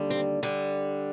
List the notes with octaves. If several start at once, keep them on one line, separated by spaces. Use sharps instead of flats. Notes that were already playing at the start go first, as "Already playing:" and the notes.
Already playing: D#2 D3 G3
C4
D3 G3